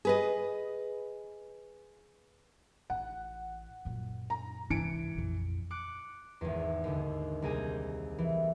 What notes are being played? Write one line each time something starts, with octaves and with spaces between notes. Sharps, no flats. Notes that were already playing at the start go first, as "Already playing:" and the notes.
G#4 B4 D#5
A1 F#5
F#2 A#2
A#5
C2 G#2 E3 C#7 D7
A#1 F2
D6 F#6 C#7
G#1 E2
D#2 D3
C2 A#3 G#4 G#5 G6
E3